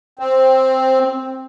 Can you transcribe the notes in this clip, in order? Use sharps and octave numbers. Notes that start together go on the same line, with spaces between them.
C4